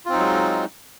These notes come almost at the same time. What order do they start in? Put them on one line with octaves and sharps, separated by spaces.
F4 C4 D#4 F#3 G#3